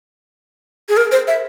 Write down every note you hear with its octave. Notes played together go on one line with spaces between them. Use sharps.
G#4
A#4
C5
E5